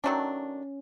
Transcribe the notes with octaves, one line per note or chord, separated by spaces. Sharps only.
D#3 F#3 A3 C#4 D4